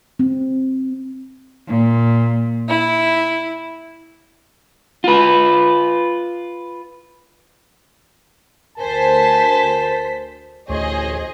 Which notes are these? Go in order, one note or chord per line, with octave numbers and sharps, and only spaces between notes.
C4
A#2
E4
F4 B4
D2 A#4 C5 G#5 A5 B6
A1 D2 G#4 C5 C#5 D#5